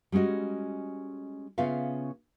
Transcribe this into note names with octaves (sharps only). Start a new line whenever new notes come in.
G3 G#3 C#4 F#4 D#5
C#3 B3 C#4 F4 E5 F5